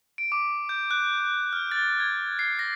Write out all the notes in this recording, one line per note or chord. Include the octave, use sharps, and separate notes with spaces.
D7
D6
G6
F#6
F6
A6
G#6
C7
A#6